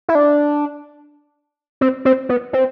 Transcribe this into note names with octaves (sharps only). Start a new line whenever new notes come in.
E4
D4
C4
C4
B3
C4